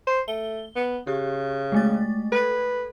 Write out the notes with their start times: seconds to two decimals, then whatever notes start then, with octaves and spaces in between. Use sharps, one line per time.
0.07 C5
0.28 A3 G7
0.76 B3
1.07 C#3 G4
1.72 G#3 A3 A6
2.32 A4 B4